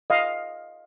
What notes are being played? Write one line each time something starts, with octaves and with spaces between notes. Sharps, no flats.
D#5 F5